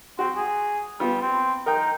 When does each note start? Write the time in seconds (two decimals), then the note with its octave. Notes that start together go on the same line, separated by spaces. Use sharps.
0.19 C4 F#4
0.36 G#4
1.00 G3 B3 F4
1.22 C4
1.66 D#4 A#4 G5